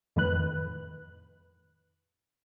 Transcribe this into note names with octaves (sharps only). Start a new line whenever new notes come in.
F2 A2 D#3 B4 F#6